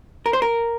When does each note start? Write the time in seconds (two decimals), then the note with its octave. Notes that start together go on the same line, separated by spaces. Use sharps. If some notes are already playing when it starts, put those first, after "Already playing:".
0.26 A#4
0.33 C5
0.42 A#4